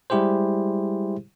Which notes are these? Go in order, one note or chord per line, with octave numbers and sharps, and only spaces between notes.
G3 G#3 E4 G4 G#4 C5